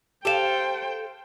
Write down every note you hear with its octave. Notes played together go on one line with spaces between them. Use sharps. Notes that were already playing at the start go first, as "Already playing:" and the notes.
G4 A4 C5 F5 G5 E7